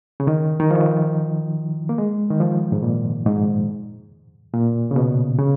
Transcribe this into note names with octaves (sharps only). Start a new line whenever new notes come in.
C#3
D#3
D#3
F3
A#3
G#3
D#3
F3
G#2
A#2
G#2
A#2
C#3
B2
C#3